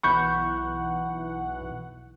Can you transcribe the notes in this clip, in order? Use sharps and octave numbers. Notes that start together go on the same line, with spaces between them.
B1 E3 F#5 B5 C#6 G6